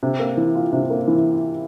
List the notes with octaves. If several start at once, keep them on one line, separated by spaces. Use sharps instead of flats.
C3
A#3
E3
F4
C3
A#3
E3